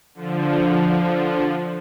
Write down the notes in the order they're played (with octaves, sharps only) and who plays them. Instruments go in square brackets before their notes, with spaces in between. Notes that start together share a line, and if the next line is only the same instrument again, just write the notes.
[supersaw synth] D3 F3